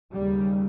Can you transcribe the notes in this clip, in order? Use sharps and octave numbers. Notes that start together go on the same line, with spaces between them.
D#2 C#3 G3